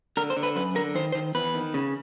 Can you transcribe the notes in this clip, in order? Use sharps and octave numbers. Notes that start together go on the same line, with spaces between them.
D3 A#4
C5
D3
B4
F#2 B4
D3 A#4
D#3 C5
D#3 C5
E2 B4
D#3
C#3